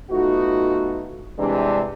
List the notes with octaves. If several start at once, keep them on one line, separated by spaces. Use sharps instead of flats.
A3 B3 D#4 F4 F#4
G2 C3 E3 G#3 D4